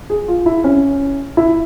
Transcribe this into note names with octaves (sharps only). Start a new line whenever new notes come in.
G#4
F4
E4
C#4
E4